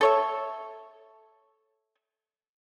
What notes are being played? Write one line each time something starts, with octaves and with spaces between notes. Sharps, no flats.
A4 C#5 E5